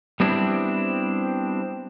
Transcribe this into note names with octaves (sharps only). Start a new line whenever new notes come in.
G3 B3 C4 D4 E4